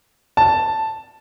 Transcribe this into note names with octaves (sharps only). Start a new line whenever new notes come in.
A5